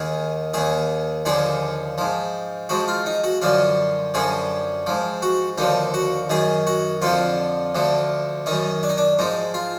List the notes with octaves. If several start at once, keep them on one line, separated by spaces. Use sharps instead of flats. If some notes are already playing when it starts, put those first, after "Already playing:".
Already playing: D#2 D#3 G#4
D#2 D#3 G#4
D#2 D3 F3 G#4
G#2 F3
G#2 F3 F#4
F4
D#4
F#4
F#2 D3 F3 F4
F#2 D3 F3 G#4
G#2 F3
F#4
D#2 D3 F3 D#4
F#4
F#2 D#3 G#4
F#4
F2 D3 F3 F4
D2 D3 F3
F#2 D#3 D#4
D4
D#4
D4
G#2 F3 D#4
F4